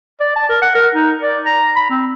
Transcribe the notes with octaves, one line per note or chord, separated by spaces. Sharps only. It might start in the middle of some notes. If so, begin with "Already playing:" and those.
D5
A5
A#4
F#5
A#4
D#4
D5
A#5
B5
C4